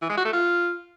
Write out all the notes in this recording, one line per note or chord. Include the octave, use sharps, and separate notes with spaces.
E3
G#3
F#4
A3
F4